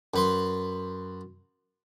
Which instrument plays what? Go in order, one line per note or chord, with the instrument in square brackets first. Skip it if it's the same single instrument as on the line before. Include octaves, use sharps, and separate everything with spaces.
[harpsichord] F#2 B4 C6